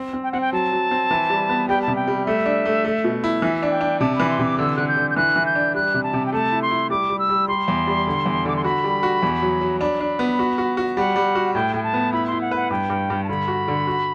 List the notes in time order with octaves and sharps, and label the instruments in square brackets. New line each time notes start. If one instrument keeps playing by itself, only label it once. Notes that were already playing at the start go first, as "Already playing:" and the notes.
Already playing: [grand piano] C4
C4
[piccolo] G5
[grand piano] C4 [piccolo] F#5
[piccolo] G5
[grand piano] F#3 [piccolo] A5
[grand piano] F#3
C4
E3
G3
B3
[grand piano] G3 [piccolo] G5
[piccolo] A5
[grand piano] C3
[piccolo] G5
[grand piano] G3
[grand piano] A3 [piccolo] E5
[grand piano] D4
A3
A3
B2
E4
[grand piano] E3 [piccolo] E5
[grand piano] D4
[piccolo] G5
[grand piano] D4
[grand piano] C3 [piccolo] A5
[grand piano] E3 [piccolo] B5
[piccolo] C6
[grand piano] C3
[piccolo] D6
[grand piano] D3 [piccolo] E6
[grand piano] D3 [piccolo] F#6
[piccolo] G6
[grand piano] D3
[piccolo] G6
[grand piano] E3 [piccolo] F#6
[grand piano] E3
[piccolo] G6
[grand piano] D4
[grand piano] G3 [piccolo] F#6
[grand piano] C3
[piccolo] A5
[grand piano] C3
[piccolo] G5
[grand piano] A3 [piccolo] A5
[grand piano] E4
[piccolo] C6
[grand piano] E4
[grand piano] G3 [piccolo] D6
[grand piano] G3
[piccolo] E6
[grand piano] G3
[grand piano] G3 [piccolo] C6
[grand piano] E2
G3
D3
E2
[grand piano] D3 [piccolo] D6
[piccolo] C6
[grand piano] F#4 [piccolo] B5
[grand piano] G3
F#4
E2
F#3
F#3
[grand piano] D4 [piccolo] B5
[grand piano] D4
B3
F#4
F#4
F#4
[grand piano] G3 [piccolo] F#5
[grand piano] G3
F#4
[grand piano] A2 [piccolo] G5
[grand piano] A2 [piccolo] G5
[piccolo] A5
[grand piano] B3
[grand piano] E4 [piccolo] B5
[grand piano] E4 [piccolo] C6
[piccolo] F#5
[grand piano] B4 [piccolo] F#5
[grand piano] G2 [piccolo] G5
[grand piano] G2
G2
[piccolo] A5
[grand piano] D3 [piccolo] B5
[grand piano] F#4
D3
F#4